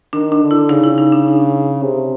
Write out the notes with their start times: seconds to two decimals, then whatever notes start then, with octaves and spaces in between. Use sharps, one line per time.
0.13 D#3 D4
0.32 D4
0.42 D3
0.51 E4
0.69 C#3 D#4
0.84 E4
0.98 D#4
1.12 D4
1.83 C3